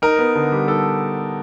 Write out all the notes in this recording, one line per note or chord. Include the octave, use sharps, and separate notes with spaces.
D#4 A#4
B3
D3
G3
D#4 A4